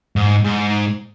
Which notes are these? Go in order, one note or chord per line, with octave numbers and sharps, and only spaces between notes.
G#2
G#2